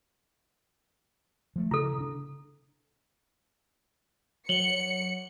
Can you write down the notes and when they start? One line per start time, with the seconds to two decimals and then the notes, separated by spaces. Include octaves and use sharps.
1.56 F3 A3
1.71 C#3 E4 A4
1.98 C#3 D4
4.49 F#3 C#7 F#7 G7